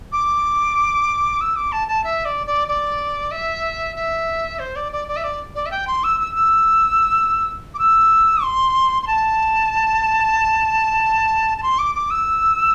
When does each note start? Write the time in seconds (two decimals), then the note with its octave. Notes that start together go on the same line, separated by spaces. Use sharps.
0.12 D6
1.41 E6
1.56 D6
1.72 A5
1.88 A5
2.04 E5
2.25 D5
2.47 D5
2.68 D5
3.31 E5
3.96 E5
4.59 C5
4.76 D5
4.92 D5
5.08 D5
5.16 E5
5.24 D5
5.55 D5
5.66 E5
5.71 G5
5.87 C6
6.04 E6
6.20 E6
6.35 E6
7.74 D6
7.79 E6
8.43 C6
9.03 C6
9.07 A5
11.58 A5
11.63 C6
11.78 D6
11.95 D6
12.10 E6